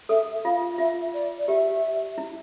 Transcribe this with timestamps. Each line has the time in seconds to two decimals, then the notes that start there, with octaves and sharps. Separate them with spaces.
0.09 A4 E5
0.45 F4 F5
0.78 F4 E5
1.14 D5
1.38 D5
1.48 G4 E5
2.18 E4